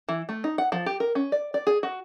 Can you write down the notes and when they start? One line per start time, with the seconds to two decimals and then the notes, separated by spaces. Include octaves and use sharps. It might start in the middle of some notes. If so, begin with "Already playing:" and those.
0.09 E3
0.29 A3
0.44 D#4
0.58 F#5
0.72 F3
0.86 G4
1.00 A#4
1.15 C#4
1.32 D5
1.54 D5
1.67 G#4
1.83 F#4